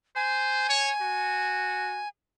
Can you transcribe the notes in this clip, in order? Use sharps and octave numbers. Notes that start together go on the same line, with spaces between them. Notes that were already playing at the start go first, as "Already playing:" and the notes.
C5 G#5
C#5
F#4